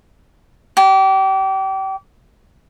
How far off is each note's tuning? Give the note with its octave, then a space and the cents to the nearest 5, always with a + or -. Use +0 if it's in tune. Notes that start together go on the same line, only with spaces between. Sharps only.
G4 -30